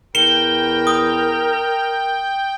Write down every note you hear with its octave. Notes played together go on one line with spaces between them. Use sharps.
E2 A#4 G5 C#7 E7 G7
D#6